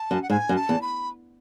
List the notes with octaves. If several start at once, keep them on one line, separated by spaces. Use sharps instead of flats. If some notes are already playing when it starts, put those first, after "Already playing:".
Already playing: A5
F#2
F#5
G#2 G#5
F#2
A5
E2
B5